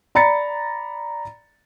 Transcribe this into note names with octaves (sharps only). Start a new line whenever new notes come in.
D5 A#5 B5 A6 C#7